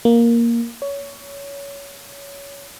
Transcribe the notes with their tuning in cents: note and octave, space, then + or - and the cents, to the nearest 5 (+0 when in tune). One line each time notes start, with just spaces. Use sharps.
A#3 +5
C#5 +20